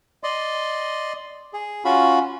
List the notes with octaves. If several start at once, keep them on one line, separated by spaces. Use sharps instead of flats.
D5 D#5 C6
G#4
C#4 F4 F#4 B5